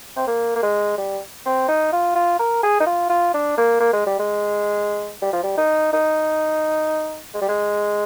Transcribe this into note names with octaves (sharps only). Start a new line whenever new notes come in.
C4
A#3
A#3
G#3
G3
C4
D#4
F4
F4
A#4
G#4
D#4
F4
F4
D4
A#3
A#3
G#3
G3
G#3
G3
F3
G3
D#4
D#4
G#3
G3
G#3